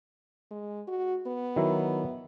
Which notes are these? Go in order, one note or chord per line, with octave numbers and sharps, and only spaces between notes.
G#3
F#4
B3
D#3 F#3 E4